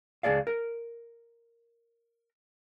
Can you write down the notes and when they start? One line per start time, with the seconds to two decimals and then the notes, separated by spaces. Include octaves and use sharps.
0.23 C#2 E3 G#4 D5 F5
0.47 A#4